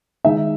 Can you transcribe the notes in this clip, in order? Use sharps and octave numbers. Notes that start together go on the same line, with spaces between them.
D#3 G#3 D#4 E5